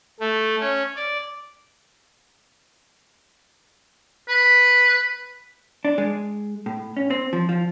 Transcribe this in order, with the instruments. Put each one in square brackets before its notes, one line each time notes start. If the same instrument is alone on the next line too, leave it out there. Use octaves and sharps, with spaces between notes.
[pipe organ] A3
C#4
D5
[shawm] B4
[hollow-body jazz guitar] D4
G#3
A2
C#4
C4
F3
F3